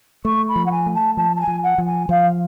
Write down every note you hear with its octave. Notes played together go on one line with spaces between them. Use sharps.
A3 C#6
B5
F3
F#5
G#5
A3
A5
F3 A5
A5
G#5
F3
F#5
F3
G#5
F3 F5